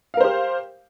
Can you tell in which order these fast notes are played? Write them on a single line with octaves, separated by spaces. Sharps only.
F5 A#4 C5 G4